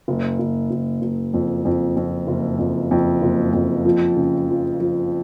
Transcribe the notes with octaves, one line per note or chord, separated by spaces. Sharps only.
F#1
F#1
F#1
F#1
F2
F2
F2
F#1
F2
F2
F#1
F2
F3
C#3
F3
F3